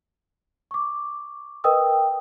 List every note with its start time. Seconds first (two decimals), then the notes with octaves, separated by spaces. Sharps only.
0.71 C#6 D6
1.64 A#4 B4 D#5 G5 D#6 E6